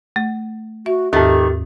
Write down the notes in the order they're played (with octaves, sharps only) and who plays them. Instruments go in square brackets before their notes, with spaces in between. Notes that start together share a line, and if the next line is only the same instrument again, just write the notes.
[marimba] A3
[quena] F#4 [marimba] E5
[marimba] D#2 G#2 [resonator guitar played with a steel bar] D#3 A3 [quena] G4